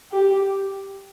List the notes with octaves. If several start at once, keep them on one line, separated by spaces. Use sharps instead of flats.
G4